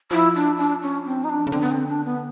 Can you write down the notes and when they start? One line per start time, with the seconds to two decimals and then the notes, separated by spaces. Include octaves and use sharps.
0.11 F3 E4
0.35 D4
0.58 D4
0.82 C#4
1.06 C4
1.24 D#4
1.30 D4
1.47 C#3
1.52 D3 C4
1.61 B3
1.71 C4
1.89 D4
2.05 B3